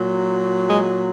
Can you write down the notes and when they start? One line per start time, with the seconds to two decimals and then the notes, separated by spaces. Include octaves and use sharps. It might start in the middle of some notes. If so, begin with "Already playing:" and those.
Already playing: A#2 F#3
0.69 G#3